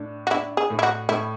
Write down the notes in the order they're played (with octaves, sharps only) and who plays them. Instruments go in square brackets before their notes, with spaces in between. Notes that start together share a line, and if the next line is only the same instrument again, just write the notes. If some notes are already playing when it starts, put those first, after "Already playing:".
Already playing: [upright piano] A2 D4
[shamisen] F#4
[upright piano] D4 [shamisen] E4
[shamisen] G#4
[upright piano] A2
[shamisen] E4
F#4
[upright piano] A2 [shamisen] E4